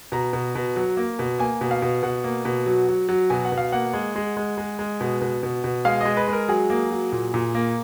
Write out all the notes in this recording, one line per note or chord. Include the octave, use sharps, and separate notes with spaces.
B2 A#5
B2
B2
F#3
A#3
B2
A#3 G#5
B2
F5
B2
B2 F#5
A#3
B2
F#3
F#3
F#3
B2 G#5
F#5
B2
F5
A#3 F#5
G#3
G#3
G#3
G#3
G#3
B2
B2
B2
B2
G#3 F5
G#3 D#5
B4
G#3 A#4
F#3 G#4
A#3
F#3
A#2
A#2
A#3